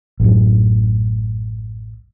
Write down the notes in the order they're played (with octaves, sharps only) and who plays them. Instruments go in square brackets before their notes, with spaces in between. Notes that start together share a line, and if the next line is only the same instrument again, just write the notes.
[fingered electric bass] A1 F#2